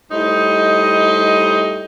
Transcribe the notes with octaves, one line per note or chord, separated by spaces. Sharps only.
A2 G3 D#4 C5 D#5